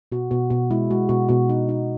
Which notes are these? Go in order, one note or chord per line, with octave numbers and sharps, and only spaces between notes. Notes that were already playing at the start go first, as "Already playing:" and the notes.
B2 F#4
B2 F#4
B2 F#4
G#3 E4
G#3 F#4
B2 F#4
B2 F#4
D#4
D#4